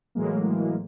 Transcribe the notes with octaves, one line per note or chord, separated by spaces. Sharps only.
A2 E3 F#3 G#3 A#3